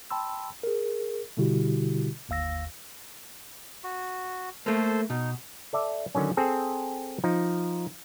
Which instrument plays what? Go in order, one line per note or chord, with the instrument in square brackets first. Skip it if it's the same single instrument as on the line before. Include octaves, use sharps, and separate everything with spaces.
[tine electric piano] G5 A5 B5 C6 E6
G#4 A#4
B2 D3 G3 E4 F#4 G4
G1 D#2 F5 E6 A#6
[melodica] F#4
[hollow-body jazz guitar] A3 A#3 [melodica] A4 C5
[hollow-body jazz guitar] B2 [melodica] D#4
[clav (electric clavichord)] A4 D5 E5
D3 D#3 F#3 C#4
C4 G#4 A4
F3 D#4